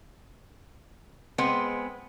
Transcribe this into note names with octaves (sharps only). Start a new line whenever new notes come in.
G#3 B3 C4 G#4